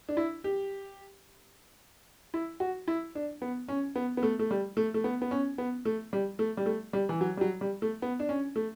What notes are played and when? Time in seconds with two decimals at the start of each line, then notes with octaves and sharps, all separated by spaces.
0.09 D4
0.17 E4
0.44 G4
2.34 E4
2.60 F#4
2.88 E4
3.15 D4
3.42 B3
3.68 C#4
3.96 B3
4.17 B3
4.23 A3
4.39 A3
4.51 G3
4.77 A3
4.94 A3
5.04 B3
5.22 B3
5.31 C#4
5.58 B3
5.85 A3
6.13 G3
6.39 A3
6.57 G3
6.66 A3
6.93 G3
7.09 E3
7.21 F#3
7.37 G3
7.41 F#3
7.61 G3
7.82 A3
8.02 B3
8.20 D4
8.29 C#4
8.56 A3